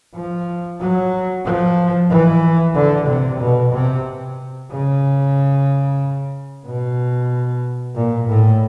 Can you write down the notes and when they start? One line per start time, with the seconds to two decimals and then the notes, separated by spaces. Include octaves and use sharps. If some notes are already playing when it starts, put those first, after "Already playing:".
0.15 F3
0.80 F#3
1.44 F3
2.10 E3
2.75 D3
3.07 C3
3.40 B2
3.73 C3
4.71 C#3
6.66 B2
7.95 A#2
8.28 A2